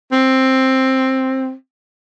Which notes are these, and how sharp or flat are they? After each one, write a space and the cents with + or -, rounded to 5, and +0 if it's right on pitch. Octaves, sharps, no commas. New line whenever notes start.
C4 +10